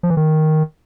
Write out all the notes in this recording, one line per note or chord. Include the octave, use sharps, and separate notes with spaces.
F3
E3
D#3